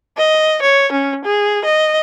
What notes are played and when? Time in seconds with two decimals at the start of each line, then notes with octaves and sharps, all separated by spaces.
0.18 D#5
0.62 C#5
0.92 C#4
1.25 G#4
1.65 D#5